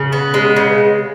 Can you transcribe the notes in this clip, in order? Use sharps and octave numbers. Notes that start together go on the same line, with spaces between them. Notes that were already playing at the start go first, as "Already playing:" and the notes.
Already playing: C#3
B3
G#3
C#3